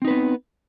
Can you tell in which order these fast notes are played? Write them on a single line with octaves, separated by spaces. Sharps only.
C4 D#4 B4 B3